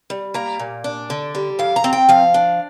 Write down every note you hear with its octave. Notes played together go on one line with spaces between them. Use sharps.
G3
A#3 A#5
A#2
D4
D3
G3
F2 F5
A#5
C4
G5
F3 F5
D4